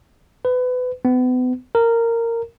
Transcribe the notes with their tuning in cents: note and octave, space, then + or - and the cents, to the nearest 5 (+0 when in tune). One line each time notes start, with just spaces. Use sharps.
B4 +25
B3 +35
A#4 -15